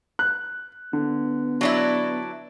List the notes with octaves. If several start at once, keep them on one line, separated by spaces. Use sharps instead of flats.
F#6
D3 B3
F#3 D4 E4